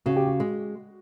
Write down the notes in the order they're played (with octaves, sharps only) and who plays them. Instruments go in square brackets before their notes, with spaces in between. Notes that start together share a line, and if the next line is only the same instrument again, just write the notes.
[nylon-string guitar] C#3 [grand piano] F#4
[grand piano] G4
F#4
[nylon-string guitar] G#3